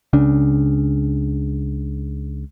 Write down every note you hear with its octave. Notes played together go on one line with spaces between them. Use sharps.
C#2 C#3 D4